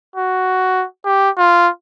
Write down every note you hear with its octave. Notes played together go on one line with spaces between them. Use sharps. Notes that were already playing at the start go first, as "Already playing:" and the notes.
F#4
G4
F4